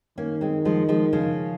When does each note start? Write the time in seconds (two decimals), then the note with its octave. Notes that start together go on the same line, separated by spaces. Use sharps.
0.18 D#3 A#3 C#4
0.41 G#3 C4
0.65 F3 G#3
0.88 F3 G#3
1.13 C#3 F3